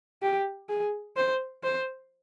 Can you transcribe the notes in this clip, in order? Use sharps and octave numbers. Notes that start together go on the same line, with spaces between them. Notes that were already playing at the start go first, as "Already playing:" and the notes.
G4
G#4
C5
C5